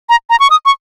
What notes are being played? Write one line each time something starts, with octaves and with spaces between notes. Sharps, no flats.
A#5
A#5
C#6
D#6
C#6